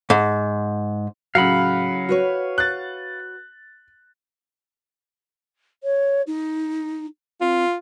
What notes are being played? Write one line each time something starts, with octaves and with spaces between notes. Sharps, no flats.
G#2
A2 C#3 F#3 F5 F#5 B5
F#4 B4 C#5
F#6 A6
C#5
D#4
C4 F4